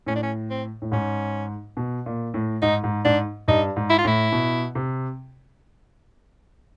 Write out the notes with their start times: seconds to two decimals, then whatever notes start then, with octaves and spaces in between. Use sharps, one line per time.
0.06 A2 C#4
0.15 D4
0.23 C#4
0.50 C4
0.82 A2
0.92 G#2 C#4
1.77 B2
2.06 A#2
2.34 A2
2.62 G#2 D#4
2.84 G#2
3.05 G#2 D4
3.48 G2 D#4
3.76 G#2
3.90 E4
3.99 F4
4.05 A2 E4
4.32 B2
4.75 C3